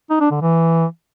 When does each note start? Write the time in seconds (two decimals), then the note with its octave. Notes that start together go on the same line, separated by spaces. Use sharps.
0.10 D#4
0.21 D4
0.31 D3
0.42 E3